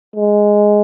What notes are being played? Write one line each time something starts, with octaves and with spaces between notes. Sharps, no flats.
G#3